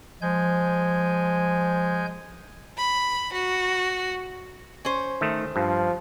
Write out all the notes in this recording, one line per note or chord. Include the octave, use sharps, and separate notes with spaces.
F3 G#3 G#5 G6
B5
F#4
C#4 C5
D#3 A3
G2 F3